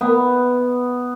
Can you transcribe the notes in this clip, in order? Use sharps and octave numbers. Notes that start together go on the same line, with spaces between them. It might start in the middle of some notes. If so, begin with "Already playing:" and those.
B3